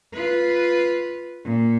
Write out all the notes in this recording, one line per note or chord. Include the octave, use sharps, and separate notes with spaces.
F4 B4
A#2